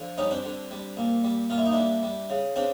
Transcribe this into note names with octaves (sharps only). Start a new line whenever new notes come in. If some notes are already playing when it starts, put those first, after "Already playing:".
Already playing: D3 F3
G3 C#4 D#4
C4 D4
D3
G3
A#2
G3
A#2 F4
E4
D#4
G3 D4 E4
G3
C#3
C#3 C4 D4